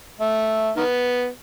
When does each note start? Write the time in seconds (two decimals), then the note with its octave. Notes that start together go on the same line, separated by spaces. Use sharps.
0.20 A3
0.76 D#3 B3